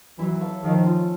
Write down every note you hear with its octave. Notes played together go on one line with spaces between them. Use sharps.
E3 F#3 E4
A4 C#5 F5
D#3 F3 A3
C#4 F4